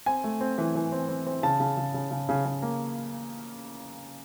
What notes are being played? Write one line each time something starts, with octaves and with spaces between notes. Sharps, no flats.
C4 G#5
A3
C4
E3
E3
C4
C4
C4
C#3 A5
C#3
C#3
C#3
C#3
C#3
C#3
A#3